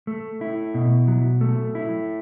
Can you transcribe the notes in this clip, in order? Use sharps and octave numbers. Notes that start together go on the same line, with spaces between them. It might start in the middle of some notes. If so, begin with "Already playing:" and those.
A3
E4
B2
F#3
A3
E4